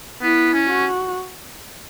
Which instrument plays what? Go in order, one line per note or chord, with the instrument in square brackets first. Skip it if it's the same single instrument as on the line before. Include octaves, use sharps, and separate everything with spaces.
[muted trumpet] B3 [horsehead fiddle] E4
[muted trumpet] C#4
[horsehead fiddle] F#4